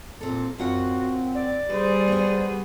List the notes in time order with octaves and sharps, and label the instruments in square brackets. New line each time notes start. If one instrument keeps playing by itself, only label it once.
[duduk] A#2 [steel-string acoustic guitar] C4 A4
[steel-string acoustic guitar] F#2 F4 F#5 [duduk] C4 [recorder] F#4
[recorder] D5
[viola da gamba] G3 G#4 [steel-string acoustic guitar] B4 [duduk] C5
[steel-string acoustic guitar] B3 F#4